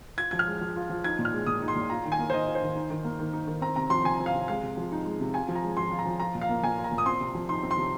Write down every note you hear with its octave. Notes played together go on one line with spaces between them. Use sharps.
F4 G#6
F3 G#6
F6
G#3
F3
F4
F3
D#4 G#6
A#2
F6
G#3
A#2 D#6
D#4
C6
A#2
F4 A#5
D#3
G#5
A#3
C5
D#3 D#5
F4
C5
D#3
D#4
D#3
A#3
D#3
D#4
D#3
C4 A#5
C3 A#5
F3 C6
C3 G#5
C4
F5
C3
G#3 F5
C3
F3
D#4
G#3
C3
F4 G#5
F3
A#5
G#3
F3 C6
F4
A#5
F3
F4 A#5
A#2
F5
A#3
A#2 G#5
F4
A#5
A#2
D#6
C4 C6
C3
F3
D#4 C6
C4
C6
C3